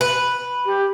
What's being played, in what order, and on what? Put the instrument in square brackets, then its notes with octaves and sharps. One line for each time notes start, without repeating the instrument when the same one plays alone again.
[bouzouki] B4
[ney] G4